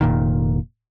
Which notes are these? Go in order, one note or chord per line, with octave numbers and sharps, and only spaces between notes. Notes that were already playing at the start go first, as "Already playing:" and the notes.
F1 A#2 D#3